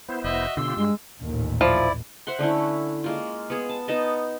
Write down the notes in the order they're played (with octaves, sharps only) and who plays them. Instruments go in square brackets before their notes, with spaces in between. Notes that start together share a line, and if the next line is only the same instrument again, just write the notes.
[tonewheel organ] B3 E4 C5
[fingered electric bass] F1 [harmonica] F#4 D#5 E5
[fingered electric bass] B2 D3 [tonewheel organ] F4 G4 C6 [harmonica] E6
[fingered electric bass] G2 [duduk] G#3
[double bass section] A1 D#2 A#2
[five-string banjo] F3 [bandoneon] E4 D5
[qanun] C5 E5 F#5 C6
D3 A3 C#4 E4
G#3 A#3 F4
B3 G#4
A5
B3 D#4 D#5 A5